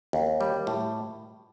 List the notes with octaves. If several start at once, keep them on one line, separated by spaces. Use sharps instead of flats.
D#2
G3
A2